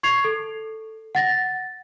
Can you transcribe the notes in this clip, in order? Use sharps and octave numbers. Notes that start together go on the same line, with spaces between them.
C#6 G#6 C7 F7
A4
F#5 A6 A#6